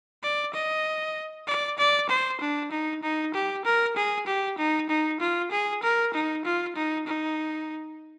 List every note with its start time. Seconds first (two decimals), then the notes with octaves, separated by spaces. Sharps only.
0.23 D5
0.54 D#5
1.47 D5
1.78 D5
2.09 C5
2.41 D4
2.72 D#4
3.03 D#4
3.34 G4
3.65 A#4
3.97 G#4
4.27 G4
4.58 D#4
4.89 D#4
5.20 F4
5.52 G#4
5.83 A#4
6.14 D#4
6.45 F4
6.76 D#4
7.07 D#4